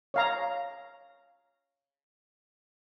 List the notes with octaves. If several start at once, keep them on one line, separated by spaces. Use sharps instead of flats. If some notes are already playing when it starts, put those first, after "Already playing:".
C#5 F5 A#5